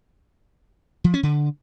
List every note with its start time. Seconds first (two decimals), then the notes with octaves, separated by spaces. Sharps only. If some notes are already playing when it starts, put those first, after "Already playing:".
1.04 F3
1.14 C#4
1.23 D3